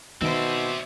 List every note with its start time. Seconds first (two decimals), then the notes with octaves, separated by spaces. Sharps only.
0.21 B2 D#3 C4 C5 D5 E5